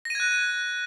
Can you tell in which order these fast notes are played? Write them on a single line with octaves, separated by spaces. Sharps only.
A#6 D#7 G#6 F#6